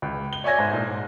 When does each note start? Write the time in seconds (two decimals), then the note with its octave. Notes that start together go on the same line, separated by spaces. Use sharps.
0.02 C#2
0.33 G7
0.44 C#5 D5 E5 G#5 G#6 A#6
0.58 G#2 C5
0.73 A#2
0.89 G#2